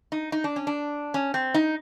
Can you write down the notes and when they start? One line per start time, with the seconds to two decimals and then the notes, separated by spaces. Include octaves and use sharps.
0.12 D#4
0.32 D#4
0.44 D4
0.56 C#4
0.67 D4
1.14 C#4
1.34 C4
1.54 D#4